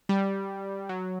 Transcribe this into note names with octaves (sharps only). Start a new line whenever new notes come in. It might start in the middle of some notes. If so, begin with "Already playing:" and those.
G3
F#3